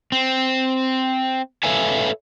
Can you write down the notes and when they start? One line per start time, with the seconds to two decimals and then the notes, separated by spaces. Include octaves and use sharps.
0.12 C4
1.63 A4 B4 C#5 E5 F5 G#5